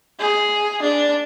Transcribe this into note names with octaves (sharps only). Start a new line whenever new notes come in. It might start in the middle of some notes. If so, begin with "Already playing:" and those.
G#4
D4